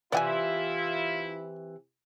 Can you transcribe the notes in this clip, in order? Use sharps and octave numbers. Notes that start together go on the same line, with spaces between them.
C3 E3 E4 F4 D5 G5 G#5